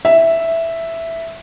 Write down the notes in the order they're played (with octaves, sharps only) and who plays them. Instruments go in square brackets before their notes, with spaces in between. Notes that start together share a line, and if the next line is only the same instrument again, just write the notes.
[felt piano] E5